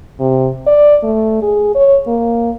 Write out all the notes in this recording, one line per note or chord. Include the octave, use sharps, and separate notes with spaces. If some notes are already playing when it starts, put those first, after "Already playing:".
C3
D5
A3
G#4
C#5
A#3